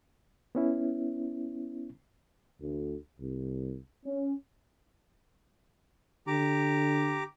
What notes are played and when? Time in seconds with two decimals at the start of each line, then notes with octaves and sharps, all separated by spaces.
0.55 B3 C#4 E4
2.60 D2
3.19 C2
4.05 C#4
6.27 D3 G4 A#5 D6